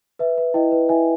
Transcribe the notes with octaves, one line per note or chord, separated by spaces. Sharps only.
B4 E5
B4
E4 D#5 G5
B4
E4 E5 G#5